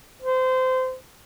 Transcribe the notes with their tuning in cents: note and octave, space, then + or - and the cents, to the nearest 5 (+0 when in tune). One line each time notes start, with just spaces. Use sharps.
C5 -25